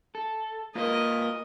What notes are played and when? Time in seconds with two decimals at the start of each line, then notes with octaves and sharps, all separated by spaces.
0.15 A4
0.75 A#3 F4 A#4 B4 D#5